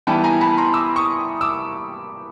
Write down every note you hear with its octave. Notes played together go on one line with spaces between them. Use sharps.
E3 G3 B3 E4 G5 A5
G#5 A#5
A5 B5
A#5 C6
D6 E6
C#6 D#6
D6 E6